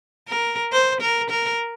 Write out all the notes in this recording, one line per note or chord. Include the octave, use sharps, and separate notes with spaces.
A#4
C5
A#4
A#4